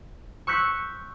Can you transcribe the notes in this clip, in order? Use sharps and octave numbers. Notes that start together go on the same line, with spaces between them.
C#6 E6 F#6 G6 B6 C#7